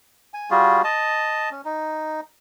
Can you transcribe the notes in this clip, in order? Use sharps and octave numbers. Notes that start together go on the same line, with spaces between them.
G#5
G3 F4 F#4 G#4
D#5 A5
C#4
D#4